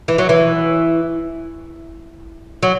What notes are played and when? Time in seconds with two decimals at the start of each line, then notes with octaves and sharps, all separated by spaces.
0.08 E3
0.18 F#3
0.29 E3
2.63 F#3